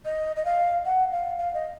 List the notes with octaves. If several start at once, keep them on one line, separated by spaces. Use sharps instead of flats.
D#5
D#5
F5
F#5
F5
F5
D#5